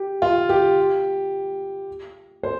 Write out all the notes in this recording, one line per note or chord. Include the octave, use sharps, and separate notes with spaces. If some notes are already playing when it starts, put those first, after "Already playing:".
Already playing: G4
F4
G4
C5